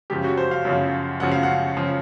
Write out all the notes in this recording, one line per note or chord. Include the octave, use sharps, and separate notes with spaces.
F#2 C#3 F3 G4
F#4
C5
F5
F#2 C#3 F3
F#2 C#3 F3 F#5
F5
F#5
C#3 F3